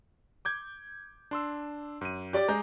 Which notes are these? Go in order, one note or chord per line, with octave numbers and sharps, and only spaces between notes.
D6 G6 G#6
D4 C6 E6
F#2 D#7
G4 D5 D6
G#3 A#5 G6